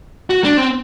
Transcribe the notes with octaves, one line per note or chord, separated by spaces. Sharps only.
F#4
D4
C4